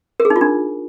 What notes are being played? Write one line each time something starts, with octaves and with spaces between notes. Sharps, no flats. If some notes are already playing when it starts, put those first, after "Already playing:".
A#4
G#4
D#4
F4
D4